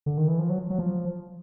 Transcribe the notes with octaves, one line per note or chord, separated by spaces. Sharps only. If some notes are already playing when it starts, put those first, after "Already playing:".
D3
D#3
E3
F3
F#3
F#3
F3